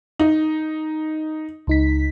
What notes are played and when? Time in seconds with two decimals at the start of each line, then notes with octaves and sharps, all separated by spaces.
0.20 D#4
1.67 C#2 D#4 B6